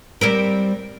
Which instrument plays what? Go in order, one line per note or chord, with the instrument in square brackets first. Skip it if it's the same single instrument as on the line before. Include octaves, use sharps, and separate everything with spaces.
[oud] G3 C4 A#4